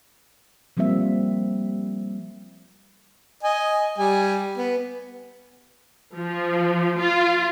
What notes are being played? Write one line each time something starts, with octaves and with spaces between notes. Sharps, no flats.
F3 G3 A#3 C4 E5
D#5 G#5
G3 G#5
B3
F3
F4